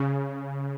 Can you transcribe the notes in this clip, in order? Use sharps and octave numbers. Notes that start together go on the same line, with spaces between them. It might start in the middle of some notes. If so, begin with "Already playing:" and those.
Already playing: C#3